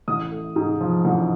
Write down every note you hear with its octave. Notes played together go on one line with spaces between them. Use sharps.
A1 D#6
A3
G#2
F3
A1